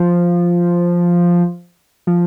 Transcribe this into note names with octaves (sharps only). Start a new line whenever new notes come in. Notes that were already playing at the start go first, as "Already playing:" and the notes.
Already playing: F3
F3